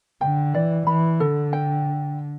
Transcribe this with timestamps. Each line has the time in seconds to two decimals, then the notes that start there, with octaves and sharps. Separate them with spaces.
0.21 D3 G5
0.54 E3 D5
0.87 E3 B5
1.20 D3 A4
1.53 G5